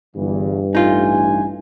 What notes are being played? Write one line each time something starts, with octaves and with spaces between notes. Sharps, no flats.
G1 E2 G2 E3
A1 A3 D#4 F4 G#5